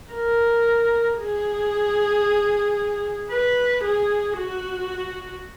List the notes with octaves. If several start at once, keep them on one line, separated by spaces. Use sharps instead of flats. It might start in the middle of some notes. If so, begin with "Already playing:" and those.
A#4
G#4
B4
G#4
F#4